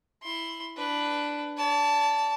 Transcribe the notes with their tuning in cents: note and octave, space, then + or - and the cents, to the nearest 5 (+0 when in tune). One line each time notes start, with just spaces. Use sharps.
E4 +0 C6 +15
D4 +0 B4 +5
D5 -40 A5 +0